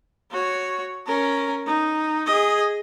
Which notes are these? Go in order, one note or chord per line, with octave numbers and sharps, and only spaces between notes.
F#4 C#5
C#4 A#4
D#4
G#4 D#5